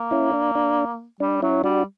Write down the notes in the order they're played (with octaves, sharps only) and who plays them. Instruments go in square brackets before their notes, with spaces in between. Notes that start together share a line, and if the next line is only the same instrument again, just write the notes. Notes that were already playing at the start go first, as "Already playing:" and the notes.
Already playing: [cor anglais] A#3
[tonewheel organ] C#4 E4
D4
D4
[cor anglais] G3 [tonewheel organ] D4
[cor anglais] F#3 [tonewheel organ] C#4 E4
[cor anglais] G3 [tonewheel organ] D4 F#4